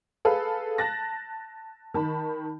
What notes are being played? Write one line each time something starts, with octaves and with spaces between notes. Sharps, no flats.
G#4 A4 B4 F5
A5 F#6 A6 A#6
D#3 A5 B5